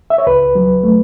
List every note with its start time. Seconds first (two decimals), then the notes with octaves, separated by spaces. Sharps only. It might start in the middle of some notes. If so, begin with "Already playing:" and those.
0.10 E5
0.18 C#5
0.27 C#2 B4
0.55 F#3
0.83 A3